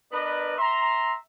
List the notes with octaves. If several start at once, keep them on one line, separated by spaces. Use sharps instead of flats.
B3 D4 A#4 B4 D5 D#5
E5 A#5 C6